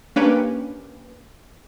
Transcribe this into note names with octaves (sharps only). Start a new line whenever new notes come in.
A#3 C#4 D4 G4 B4